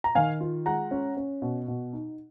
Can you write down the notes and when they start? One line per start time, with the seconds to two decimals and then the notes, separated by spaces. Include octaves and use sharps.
0.04 A#5
0.15 D#3 F5 G#5
0.41 F4
0.66 G#3 F#5 A#5
0.91 C#4
1.17 C#4
1.42 B2
1.68 B2
1.93 D#4